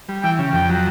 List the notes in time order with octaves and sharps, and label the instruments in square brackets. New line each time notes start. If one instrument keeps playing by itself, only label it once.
[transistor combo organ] G3
[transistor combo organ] E3 [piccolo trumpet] G5
[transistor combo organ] C#3
[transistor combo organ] F2 [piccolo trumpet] G5
[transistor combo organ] F#3